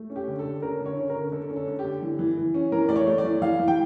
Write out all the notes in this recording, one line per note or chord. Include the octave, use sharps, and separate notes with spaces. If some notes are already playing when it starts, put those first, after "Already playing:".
Already playing: A3
C#4
G4
D3
A4
D3
C#4 A#4
D3
C#5
C#4
A#4
D3
D3 A4
C#4
A4
D3
G4
D3
E3
E3
E3
C#4
E3 A#4
A3 D5
C#5
A3
D5
E3
E3 F5
E3
G5